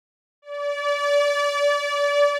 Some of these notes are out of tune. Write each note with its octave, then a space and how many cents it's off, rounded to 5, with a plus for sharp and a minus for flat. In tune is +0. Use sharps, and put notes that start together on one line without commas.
D5 -30